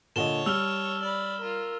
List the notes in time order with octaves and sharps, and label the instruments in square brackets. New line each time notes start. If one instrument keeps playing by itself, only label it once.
[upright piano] A#2 D3 D#5 [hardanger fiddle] C#5 A5 [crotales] E7 G7
[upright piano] G3 F7 G7 [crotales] E6 F6
[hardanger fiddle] D5 B5
F4 A#4